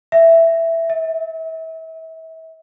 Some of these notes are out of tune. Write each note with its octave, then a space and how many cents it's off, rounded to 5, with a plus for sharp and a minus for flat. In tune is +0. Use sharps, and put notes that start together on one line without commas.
E5 +5
E5 -35